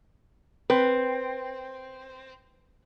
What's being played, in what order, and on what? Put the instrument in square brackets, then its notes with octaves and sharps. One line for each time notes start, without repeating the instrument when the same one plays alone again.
[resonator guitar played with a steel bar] C4 [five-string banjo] B4